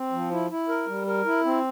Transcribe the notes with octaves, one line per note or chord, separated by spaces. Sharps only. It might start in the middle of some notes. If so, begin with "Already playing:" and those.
Already playing: C4
F3
E4
E4
A#4
G3
A#4
E4
C4